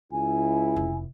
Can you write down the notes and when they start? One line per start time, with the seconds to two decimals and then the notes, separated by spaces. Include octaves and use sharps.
0.12 C#2 E4 G#5
0.76 F1